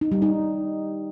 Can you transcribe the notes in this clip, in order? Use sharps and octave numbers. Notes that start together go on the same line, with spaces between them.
D#4
G3
D#4